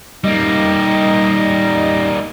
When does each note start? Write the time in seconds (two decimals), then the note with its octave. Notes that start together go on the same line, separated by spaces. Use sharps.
0.24 G3 A#3 D#4 D#5